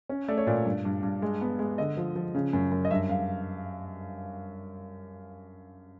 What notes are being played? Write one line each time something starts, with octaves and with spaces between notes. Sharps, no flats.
C#4
A3 D5
C#5
A#2 D5
G2
G2
G2
G#3
B3
G#3
D3 D#5
F3
F3
C#3
F#2
F#2
D#5
G2 E5
G2 F5